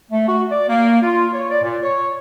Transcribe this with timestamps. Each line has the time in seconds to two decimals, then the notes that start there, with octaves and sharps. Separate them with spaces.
0.11 A3
0.28 F#4
0.51 D5
0.68 A#3
1.03 F4
1.32 C#5
1.50 D5
1.62 A#2
1.82 C#5